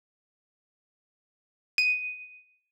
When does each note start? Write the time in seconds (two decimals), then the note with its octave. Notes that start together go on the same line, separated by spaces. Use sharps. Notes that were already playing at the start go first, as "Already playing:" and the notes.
1.78 D#7